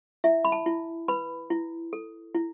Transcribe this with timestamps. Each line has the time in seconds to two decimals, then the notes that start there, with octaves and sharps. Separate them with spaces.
0.24 E4 E5
0.45 B5
0.52 A5
0.66 E4
1.08 B4 B5
1.50 E4
1.93 A4
2.35 E4